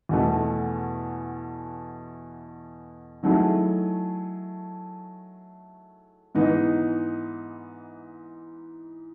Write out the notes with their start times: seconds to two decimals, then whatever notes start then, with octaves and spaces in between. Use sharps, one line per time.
0.09 E2 B2 A3
3.23 D#3 F#3 A3 E4 G#4
6.35 G#2 E3 B3 D#4